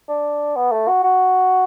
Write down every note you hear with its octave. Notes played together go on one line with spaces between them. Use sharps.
D4
B3
A3
F#4
F#4